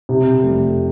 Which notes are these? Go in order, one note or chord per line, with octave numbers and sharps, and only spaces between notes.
C3
F1